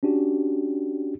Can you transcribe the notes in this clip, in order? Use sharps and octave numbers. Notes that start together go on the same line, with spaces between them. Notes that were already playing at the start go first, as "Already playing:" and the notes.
C#4 D4 F#4 G4